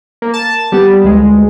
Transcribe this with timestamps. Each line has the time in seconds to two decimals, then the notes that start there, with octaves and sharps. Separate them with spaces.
0.22 A#3
0.34 A5
0.72 G3 B3
1.04 D2 G#3